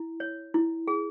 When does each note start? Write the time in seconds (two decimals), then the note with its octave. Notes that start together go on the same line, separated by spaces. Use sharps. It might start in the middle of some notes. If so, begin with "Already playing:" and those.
Already playing: E4
0.20 C#5
0.54 E4
0.88 G#4